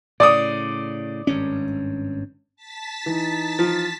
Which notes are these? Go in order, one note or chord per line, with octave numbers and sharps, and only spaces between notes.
A2 C#3 D5 D6 D#6
G#1 G2 C#4
A5 A6 B6
E3 D#4
F3